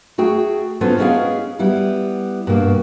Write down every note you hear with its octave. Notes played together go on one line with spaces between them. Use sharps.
A3 F#4 G#4 G5
B3 C#4 F4 A4 B4 C5
G#3 B3 C#4 E4 G#4 F5
G3 B3 E4
G2 B2 A#3